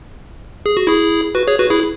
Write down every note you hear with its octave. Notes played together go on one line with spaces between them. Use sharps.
G#4
F#4
E4 G#4
F#4 B4
G#4 C#5
F#4 B4
E4 G#4